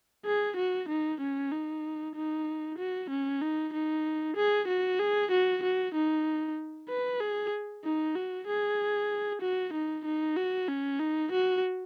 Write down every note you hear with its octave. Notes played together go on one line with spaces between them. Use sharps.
G#4
F#4
D#4
C#4
D#4
D#4
F#4
C#4
D#4
D#4
G#4
F#4
G#4
F#4
F#4
D#4
B4
G#4
D#4
F#4
G#4
F#4
D#4
D#4
F#4
C#4
D#4
F#4